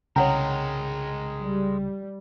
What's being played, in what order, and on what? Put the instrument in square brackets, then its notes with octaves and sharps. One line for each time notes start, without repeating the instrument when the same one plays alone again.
[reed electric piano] C2 C#3 G5 [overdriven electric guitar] G#3 A#4 [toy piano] C#5 F#5 A#5
[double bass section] G3